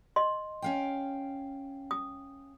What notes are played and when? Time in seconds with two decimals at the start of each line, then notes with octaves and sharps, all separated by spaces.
0.16 D#5 C6
0.62 C#4 F5 G5
1.91 D#6